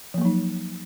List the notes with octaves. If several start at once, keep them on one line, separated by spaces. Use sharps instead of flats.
F3 F#3 A#3 D#4